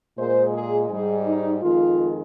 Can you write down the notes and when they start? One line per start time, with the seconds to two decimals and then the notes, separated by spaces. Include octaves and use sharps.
0.18 A#2 G#3 C5
0.53 G#4
0.89 G#2 G3 G#4
1.26 D#4
1.61 F2 D#3 G#3 F4